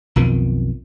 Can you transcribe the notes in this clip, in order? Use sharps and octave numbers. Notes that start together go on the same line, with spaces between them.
B1 F2 D#3